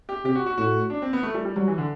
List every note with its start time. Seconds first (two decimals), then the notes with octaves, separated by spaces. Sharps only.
0.09 G4
0.25 C3 G4
0.35 F#4
0.46 F#4
0.57 A2 F#4
0.90 D4
1.02 C4
1.13 B3
1.23 A3
1.35 G3
1.45 G3
1.56 F#3 G3
1.68 E3
1.78 D3